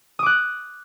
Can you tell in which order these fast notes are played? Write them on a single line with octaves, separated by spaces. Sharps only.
D#6 D6 F#6